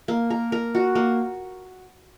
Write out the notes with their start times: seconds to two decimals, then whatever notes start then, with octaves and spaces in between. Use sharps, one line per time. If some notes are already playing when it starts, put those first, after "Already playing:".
0.08 A#3
0.30 A#4
0.52 A#4
0.75 F#4
0.95 A#3